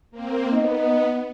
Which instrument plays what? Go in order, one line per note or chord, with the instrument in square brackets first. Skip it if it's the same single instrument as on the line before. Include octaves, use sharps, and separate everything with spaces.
[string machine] A#3 C4
[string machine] B3 [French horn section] D#4 D#5